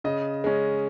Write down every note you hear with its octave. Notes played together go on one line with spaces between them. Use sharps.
C#3 D#5
G#3 C#4